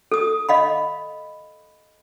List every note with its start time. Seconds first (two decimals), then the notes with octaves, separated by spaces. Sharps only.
0.12 A4 D#6
0.49 D#5 F5 B5